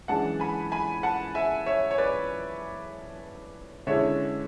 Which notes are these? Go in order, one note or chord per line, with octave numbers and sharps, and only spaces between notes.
F#2 E3 G#3 D4 F#5 A5
G#5 B5
G#5 B5
F#5 A5
E5 G#5
C#5 E5
C#5
B4 D5
D3 G#3 C#4 E4 C#5 E5